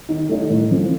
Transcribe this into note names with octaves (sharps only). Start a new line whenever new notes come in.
D#3
A3 D#4
A2
F3 C4